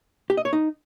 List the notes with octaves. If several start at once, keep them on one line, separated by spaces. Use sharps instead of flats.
G4
D#5
C#5
D#4